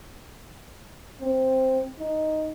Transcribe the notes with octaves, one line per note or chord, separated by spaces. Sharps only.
C4
D#4